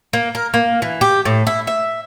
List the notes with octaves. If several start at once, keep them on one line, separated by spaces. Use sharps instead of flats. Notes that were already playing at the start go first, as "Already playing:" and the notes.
A#3
A#4
A#3
E3
G4
A2
E4
E5